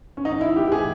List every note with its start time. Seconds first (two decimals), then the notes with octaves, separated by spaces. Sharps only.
0.17 C#4
0.25 D#4
0.41 E4
0.56 G4
0.68 G4
0.72 G#4